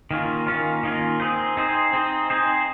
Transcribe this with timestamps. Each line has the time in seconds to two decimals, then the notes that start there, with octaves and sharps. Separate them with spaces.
0.11 D#3 A#3 C#4 F4
0.47 D#3 A#3 C#4 F4
0.84 D#3 A#3 C#4 F4
1.20 C4 D#4 G#4 C5
1.57 C4 D#4 G#4 C5
1.93 C4 D#4 G#4 C5
2.30 C4 D#4 G#4 C5